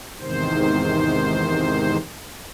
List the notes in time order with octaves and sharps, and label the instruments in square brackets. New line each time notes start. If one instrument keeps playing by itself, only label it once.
[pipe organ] E2 G#2 C3 D#3 C5